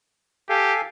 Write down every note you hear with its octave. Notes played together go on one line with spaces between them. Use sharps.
G4 A4 F5 G#5